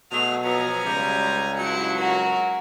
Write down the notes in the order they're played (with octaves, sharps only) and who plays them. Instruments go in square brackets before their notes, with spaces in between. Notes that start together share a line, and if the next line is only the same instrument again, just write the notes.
[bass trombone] B2 [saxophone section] F#3 A3 G#4 [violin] F7
[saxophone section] F3 F#3 B3 [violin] G#5 A#5
[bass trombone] C#2 [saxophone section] G3
[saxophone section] G2 F#3 [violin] E4 C#7
[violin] F#4 A#4